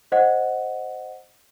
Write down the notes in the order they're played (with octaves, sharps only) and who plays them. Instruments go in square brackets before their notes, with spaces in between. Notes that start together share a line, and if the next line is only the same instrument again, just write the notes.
[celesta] C5 D#5 F#5